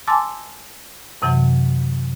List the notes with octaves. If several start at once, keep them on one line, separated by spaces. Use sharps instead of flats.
G#5 A5 C6 D6 E6 A6
F#2 C3 E3 F#3